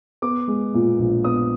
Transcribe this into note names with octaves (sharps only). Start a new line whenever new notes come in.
B3 D6
G#3
A#2
A#1
B3 D#6